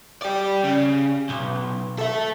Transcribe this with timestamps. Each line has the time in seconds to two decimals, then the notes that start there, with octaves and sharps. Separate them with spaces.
0.22 G4 D5
0.64 C#3
1.30 B1
1.99 A4 E5